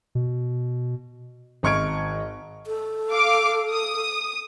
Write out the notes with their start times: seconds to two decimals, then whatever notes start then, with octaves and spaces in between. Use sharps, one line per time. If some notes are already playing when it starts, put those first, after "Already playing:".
0.15 B2
1.63 G#1 D#5 C#6 F6 G#6 D7
2.67 A4
3.10 F5 D6
3.70 D#6